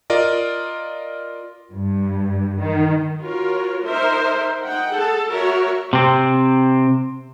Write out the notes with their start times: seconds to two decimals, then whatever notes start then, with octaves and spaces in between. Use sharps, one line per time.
0.10 F4 A#4 D5 D#5
1.71 G2
2.59 D#3
3.22 F4 F#4 A#4 C#5
3.85 D#4 A#4 C5 E5
4.64 D#4 F#5 G5
4.93 G#4 A4 A5
5.31 F#4 A#4 C#5 E5
5.93 C3 C4